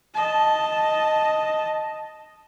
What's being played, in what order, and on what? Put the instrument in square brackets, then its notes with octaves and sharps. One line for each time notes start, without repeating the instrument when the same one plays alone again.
[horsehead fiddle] D#5 A5